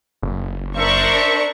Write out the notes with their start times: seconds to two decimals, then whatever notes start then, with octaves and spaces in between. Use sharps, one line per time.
0.22 F#1
0.76 D4 A#4 C5 E5 C#6